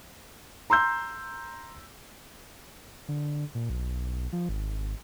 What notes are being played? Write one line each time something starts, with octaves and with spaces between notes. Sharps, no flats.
A#5 C6 E6 G6
D3
A#2
B1
F3
G#1